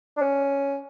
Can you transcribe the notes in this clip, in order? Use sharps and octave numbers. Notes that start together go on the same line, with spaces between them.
D4
C#4